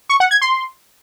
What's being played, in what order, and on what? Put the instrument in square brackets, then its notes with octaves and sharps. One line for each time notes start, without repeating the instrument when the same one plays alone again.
[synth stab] C#6
F#5
G#6
C6